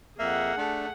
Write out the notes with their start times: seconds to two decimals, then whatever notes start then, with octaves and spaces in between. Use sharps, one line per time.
0.19 F2 A#3 G#4 E5 F#5
0.57 A3 D4